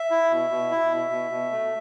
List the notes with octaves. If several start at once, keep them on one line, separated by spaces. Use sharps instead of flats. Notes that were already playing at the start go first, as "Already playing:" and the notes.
Already playing: E5
E4
B2
B2
E4
B2
B2
B2
A3